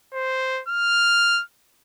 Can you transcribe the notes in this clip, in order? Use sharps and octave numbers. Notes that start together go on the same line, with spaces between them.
C5
F6